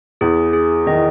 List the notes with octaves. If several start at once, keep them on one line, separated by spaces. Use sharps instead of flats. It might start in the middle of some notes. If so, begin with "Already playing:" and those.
E2 E3 G#4
G#4
D#3 D#5
E3